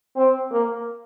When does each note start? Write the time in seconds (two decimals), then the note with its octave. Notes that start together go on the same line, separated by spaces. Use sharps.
0.16 C4
0.51 A#3